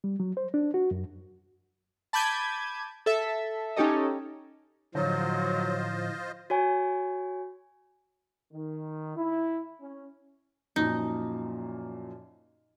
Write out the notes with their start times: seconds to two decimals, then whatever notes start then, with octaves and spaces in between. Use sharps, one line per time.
0.04 G3
0.20 F#3
0.37 C5
0.54 D4
0.74 F#4
0.91 F#2
2.13 A5 B5 D6 G6 G#6 D#7
3.06 A4 E5
3.76 C#4 D#4 G4 A4 D#5
4.95 A2 D3 F3 F#3 F4 C5 D#5
6.50 F#4 C#5 G#5
8.53 D#3
9.17 E4
9.81 C#4
10.76 F#2 A#2 F3 D#4